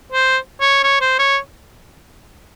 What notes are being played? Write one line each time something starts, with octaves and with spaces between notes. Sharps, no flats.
C5
C#5
C#5
C5
C#5